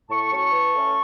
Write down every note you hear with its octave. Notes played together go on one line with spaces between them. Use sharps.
A2 A5 C#6
F#3 C#4
E3
A3 C#4